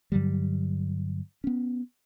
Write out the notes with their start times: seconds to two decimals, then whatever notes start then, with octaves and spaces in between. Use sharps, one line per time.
0.12 G2 D3 F#3 G3
1.44 B3 C#4